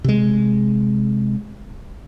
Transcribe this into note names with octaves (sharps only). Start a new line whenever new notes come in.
C3 G#3